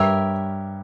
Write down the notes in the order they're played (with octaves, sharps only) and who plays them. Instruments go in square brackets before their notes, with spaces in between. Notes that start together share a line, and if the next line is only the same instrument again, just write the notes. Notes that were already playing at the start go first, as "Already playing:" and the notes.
Already playing: [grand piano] G2 [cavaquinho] G4 A#4 C#5 E5